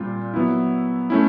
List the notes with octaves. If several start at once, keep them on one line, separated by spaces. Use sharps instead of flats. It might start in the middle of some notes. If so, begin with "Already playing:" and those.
Already playing: A#2 G3 C4 F4
F#3 B3 E4
A3 C#4 E4